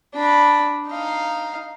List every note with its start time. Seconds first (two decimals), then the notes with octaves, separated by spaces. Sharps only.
0.15 D4 B5
0.87 D#4 F5